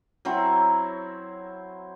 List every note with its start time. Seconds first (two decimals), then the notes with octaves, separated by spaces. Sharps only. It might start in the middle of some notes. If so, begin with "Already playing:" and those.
0.25 F#3 C4 E4 C#5